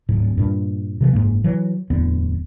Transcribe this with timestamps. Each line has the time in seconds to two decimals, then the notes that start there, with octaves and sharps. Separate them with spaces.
0.09 D1 G#2
0.38 G2 A#2
1.01 C3 E3 F3
1.13 F#1 F2 G#2 A#3
1.44 E3 F#3
1.90 D1 E2 D3 B3